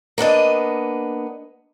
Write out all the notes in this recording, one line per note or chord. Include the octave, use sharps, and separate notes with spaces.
A#3 B3 D4 D#5